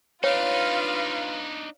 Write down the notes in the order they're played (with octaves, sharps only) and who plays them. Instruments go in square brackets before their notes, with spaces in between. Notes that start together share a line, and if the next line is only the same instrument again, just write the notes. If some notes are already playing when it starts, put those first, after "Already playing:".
[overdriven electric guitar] D4 D#4 [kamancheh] F4 B4 [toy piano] C#5 [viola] F5